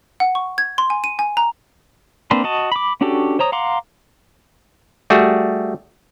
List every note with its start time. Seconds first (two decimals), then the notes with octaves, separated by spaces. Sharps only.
0.20 F#5
0.35 C#6
0.58 G#6
0.78 C6
0.90 G#5
1.04 D#7
1.19 G#5
1.37 A#5
2.31 A#3 C4 D4 B4 C5
2.44 F#4 D#5 A5
2.72 B5 D6
3.01 C#4 D4 F#4 G4 A4
3.39 C5 C#5 A#5 D#6
3.52 F5 F#5 A#5 C6 D6
5.10 G3 A3 F#4 G#4